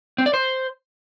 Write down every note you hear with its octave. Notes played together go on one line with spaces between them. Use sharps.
C4
D5
C5